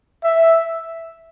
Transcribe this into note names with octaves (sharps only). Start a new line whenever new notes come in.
E5